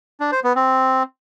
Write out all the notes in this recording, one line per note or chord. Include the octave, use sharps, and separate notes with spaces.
D4
C5
B3
C4